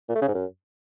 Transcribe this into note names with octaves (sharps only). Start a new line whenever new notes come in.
A#2
A3
C#3
G#2
F#2